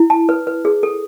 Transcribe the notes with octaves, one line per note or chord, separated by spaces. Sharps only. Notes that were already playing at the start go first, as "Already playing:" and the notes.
Already playing: E4
A5
B4
B4
G#4
A4